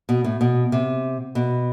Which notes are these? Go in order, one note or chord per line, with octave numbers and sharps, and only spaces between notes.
B2
A2
B2
C3
B2